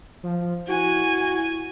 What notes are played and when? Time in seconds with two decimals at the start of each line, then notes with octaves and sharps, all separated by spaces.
0.23 F3
0.68 E4 F#4 G#5